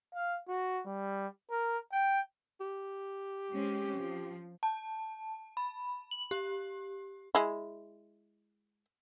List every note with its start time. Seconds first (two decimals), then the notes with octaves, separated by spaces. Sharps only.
0.14 F5
0.48 F#4
0.86 G3
1.51 A#4
1.92 G5
2.60 G4
3.53 G#3 C4 C#4
3.96 F3
4.63 A5
5.57 B5
6.11 F#7
6.31 G4
7.35 G#3 E4